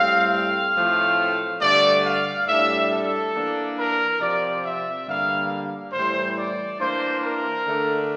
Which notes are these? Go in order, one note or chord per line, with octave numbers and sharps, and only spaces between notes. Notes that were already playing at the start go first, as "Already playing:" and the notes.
Already playing: A2 G3 C4 F5
F5
A2 F3 A3 C4
G2 D3 A3 D5
F5
A2 G3 D4 E5
A4
E3 A#3 D4
A#4
C3 F3 C4 D5
E5
G2 D3 G3 A#3 F5
A2 E3 G3 C5
D5
E3 A#3 D4 C5
A#4
D3 A3 D4